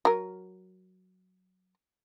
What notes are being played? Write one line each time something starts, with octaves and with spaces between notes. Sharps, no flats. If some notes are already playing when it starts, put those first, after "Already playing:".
F#3 A#4